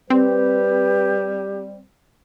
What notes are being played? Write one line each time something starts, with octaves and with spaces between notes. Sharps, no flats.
G3 C4 G4 B4